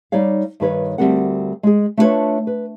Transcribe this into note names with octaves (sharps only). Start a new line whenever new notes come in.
G3 D#4 C#5 D5 F5
G2 D#3 B4 C#5
D2 C#3 G3 C4 A#4 F#5
G#3 G#4
A3 D4 F4 G4 B4 C#5
B4